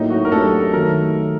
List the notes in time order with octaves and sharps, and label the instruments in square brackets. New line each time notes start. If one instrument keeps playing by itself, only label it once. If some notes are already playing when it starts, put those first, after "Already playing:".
Already playing: [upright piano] A2 F#3 A#3 [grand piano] D#4
[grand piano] F#4
A#4
[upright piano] F#2 F#3 A3 D4 G4 [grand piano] A4
[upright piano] D#3 F#3 A3 [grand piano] A#4